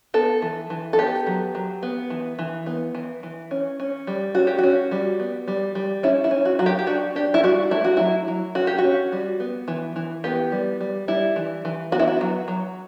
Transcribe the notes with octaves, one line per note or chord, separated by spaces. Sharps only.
B3 A4
E3
E3
A4
B3 G4
F#3
F#3
B3
E3
E3
B3
E3
E3
C#4
C#4
G3
C#4 F#4
G4
C#4 F#4
G3
B3
G3
G3
C#4 E4
E4
C#4
F#4
F#3 F#4
G4
G4
D4 F#4
D4 G4
E4
G3 F#4
A3 E4
F#4
F#3 E4
F#3
C#4 F#4
G4
F#4
C#4
G3
B3
E3
E3
B3 G4
G3
G3
G3 E4
E3
E3
B3 F#4
E4
F#4
F#3
F#3